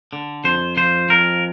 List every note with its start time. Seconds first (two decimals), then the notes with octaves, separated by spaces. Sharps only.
0.13 D3
0.44 F2 C5
0.77 F3 C5
1.09 F2 A#4